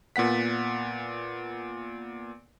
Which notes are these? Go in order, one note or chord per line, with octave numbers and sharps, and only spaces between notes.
A#2 B3 F#5 B6